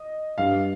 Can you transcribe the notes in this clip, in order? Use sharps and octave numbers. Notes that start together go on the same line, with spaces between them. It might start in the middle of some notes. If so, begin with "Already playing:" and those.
Already playing: D#5
G2 F5